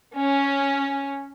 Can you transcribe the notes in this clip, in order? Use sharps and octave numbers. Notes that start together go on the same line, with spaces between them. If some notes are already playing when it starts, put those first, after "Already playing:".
C#4